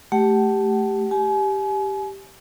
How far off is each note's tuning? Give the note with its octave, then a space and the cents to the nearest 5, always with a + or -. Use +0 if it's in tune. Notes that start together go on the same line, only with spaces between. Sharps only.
A3 -10 G4 +0 F#5 +35
G4 +0 G#5 +35